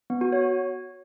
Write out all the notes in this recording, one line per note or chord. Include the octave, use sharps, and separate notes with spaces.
B3
F#4
C#5